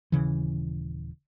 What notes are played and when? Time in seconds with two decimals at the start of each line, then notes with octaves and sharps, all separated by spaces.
0.12 D#1 C#3 E3